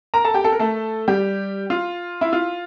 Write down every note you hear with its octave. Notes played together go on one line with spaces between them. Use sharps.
A#4 A#5
A4 A5
G4 G5
A4
A#4
A3 A4
G3 G4
F4
E4
F4